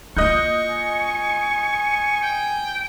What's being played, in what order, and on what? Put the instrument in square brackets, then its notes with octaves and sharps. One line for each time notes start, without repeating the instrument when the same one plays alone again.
[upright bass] A#3 F4 [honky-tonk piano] D#5 F#6 G6 [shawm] C#6
[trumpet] G#5
[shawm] G5